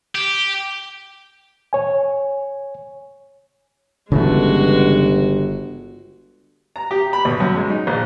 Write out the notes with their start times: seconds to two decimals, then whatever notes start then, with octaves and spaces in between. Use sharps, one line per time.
0.15 G4
1.73 C#5 G#5
4.12 G1 C#3 E3 G#3 A3 F#4
6.76 A#5
6.91 G4
7.13 B5
7.25 B1
7.40 F#2
7.56 G#3
7.70 D#4
7.87 A#1